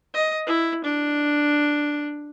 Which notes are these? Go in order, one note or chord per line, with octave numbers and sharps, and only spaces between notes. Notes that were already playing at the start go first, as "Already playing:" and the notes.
D#5
E4
D4